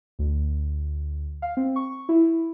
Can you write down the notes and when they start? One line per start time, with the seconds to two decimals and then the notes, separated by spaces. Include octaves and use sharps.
0.19 D2
1.42 F5
1.57 C4
1.76 C#6
2.09 E4